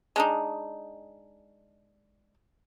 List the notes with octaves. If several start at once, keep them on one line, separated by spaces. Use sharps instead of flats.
G#3 D4 D#4